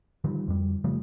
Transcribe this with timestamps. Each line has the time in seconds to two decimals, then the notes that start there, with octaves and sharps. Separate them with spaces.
0.24 D3 D#3 F3 G3
0.48 F2 G3
0.84 C#3 F3 G3 A3